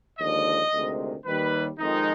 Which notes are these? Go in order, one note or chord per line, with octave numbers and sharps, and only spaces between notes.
D#2 D3 F3 G#3 D#5
D2 C3 D#3 G#3
D#2 D#3 G3 B4
F2 D#3 G#3 D#4